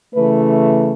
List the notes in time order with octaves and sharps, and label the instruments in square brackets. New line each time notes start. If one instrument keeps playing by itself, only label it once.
[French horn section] C#3 E3 A3 B4